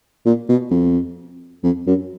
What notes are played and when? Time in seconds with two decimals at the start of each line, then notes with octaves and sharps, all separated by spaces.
0.26 A#2
0.49 B2
0.71 F2
1.64 F2
1.87 F#2